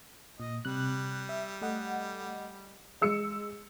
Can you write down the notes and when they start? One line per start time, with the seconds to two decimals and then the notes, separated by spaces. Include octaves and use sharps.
0.40 A#2 D#5
0.65 C3 G3 F#6
1.29 E5
1.61 A3 D#5 F#5
3.01 G#3 E6 C#7